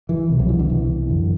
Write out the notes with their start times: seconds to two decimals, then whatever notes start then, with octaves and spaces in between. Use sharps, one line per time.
0.09 E3
0.29 C2 B2
0.39 F#3
0.49 E3
0.59 D3
0.69 C2 B2 E3
1.09 F#2 D3